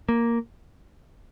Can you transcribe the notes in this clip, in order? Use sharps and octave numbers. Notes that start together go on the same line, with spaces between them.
A#3